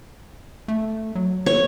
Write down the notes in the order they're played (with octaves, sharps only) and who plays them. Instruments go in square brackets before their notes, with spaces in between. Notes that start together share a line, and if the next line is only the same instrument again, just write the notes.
[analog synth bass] A3
F#3
[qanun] C#5